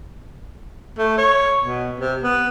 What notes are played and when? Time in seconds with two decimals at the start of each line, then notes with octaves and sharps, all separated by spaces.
0.98 A3
1.18 C#5
1.63 B2
1.99 C3
2.23 B3